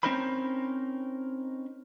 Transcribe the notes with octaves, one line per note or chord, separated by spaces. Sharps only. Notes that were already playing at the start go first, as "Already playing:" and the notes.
C4 C#4 D#4 A#4 C5 B5